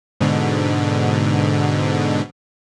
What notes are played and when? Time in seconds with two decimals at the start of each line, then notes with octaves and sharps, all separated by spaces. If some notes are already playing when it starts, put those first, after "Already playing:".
0.21 G#2 B2 D3